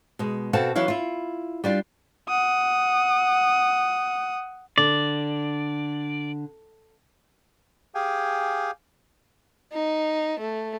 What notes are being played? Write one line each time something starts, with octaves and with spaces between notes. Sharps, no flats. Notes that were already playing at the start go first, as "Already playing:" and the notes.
B2 G#3
B2 C4 F#4 A4 F5 A5
E3 F#3 E4 F5
E4 F4
G3 D4 F4
F#5 D#6
D3 D5
G4 G#4 F5 G5 G#5
D#4
A3